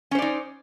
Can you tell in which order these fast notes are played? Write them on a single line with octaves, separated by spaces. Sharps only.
C#4 C5 D5 D#4